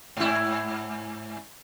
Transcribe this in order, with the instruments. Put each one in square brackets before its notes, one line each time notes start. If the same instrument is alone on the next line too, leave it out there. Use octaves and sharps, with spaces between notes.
[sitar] G#2 E4